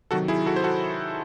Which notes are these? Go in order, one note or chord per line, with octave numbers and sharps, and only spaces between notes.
C3 D#3 F#3 F#4 A4
E4 G#4
F#4 A4
C5
F#4 A4